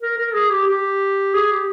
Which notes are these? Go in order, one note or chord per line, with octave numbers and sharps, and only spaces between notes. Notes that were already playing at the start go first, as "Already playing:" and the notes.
A#4
A#4
G#4
G4
G4
G#4
G4